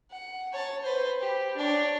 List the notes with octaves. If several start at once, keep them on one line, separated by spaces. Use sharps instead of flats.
F#5
C#5 A5
B4 C5
G4
D4 C#5